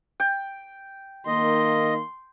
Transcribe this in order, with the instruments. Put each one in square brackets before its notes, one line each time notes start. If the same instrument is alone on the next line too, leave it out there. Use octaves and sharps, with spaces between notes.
[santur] G5
[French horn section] D#3 A#3 [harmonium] D#5 [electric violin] C6